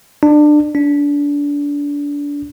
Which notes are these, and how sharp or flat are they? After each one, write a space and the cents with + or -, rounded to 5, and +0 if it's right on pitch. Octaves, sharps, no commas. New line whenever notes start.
D4 +25
D4 -25